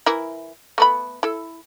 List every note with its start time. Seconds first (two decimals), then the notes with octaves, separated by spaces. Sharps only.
0.06 E3 E4 A#4
0.78 A3 B3 B5
1.23 E4 A4